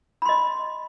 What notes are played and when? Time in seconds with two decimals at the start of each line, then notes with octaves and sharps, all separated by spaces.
0.22 B5
0.25 C6
0.29 D#5